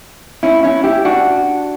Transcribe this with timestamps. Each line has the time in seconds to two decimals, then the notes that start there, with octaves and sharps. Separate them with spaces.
0.43 C#4 E4
0.63 C#4 E4
0.84 E4 G4
1.05 D4 F#4